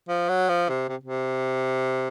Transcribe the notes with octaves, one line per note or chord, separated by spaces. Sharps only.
F3
F#3
F3
C3
C3
C3